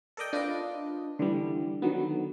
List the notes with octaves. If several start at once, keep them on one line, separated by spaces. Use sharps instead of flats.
A4 A#4 D5 D#5 G5
D4 F4 B4 D5 D#5 F5
D3 E3 G3
D3 D#3 F#3 B3